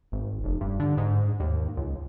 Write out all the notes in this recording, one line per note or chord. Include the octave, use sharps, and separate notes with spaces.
G#1
F1
G2
D3
G#2
D#2
C#2